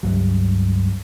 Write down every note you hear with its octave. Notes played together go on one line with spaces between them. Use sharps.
C#2 G2 F#3